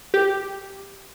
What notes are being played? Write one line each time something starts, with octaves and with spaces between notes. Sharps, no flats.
G4